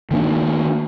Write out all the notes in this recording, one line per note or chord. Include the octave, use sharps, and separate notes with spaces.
D#3 A#3 D4